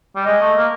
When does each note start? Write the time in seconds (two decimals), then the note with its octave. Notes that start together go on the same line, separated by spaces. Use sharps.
0.15 G3
0.25 G#3 D#5
0.41 A3
0.56 A#3